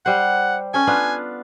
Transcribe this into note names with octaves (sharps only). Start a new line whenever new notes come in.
G3 C5 F#5
C#4 A4 G#5
B3 D4 F4